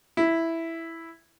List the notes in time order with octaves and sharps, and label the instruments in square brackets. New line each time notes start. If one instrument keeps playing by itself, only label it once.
[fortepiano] E4